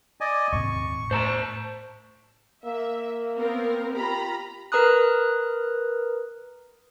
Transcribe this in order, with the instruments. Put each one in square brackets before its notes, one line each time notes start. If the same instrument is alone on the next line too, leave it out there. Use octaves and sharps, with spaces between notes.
[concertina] D5 D#5 G#5
[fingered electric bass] D#1 G#2 C3 [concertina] C#6
[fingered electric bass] A2 [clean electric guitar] C5 A5 A#5
[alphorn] A#3 [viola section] E5
[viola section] B3 C4 A#4
[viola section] F4 A#5 B5 [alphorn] G4
[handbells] A#4 B4 A#5 D#6 F#6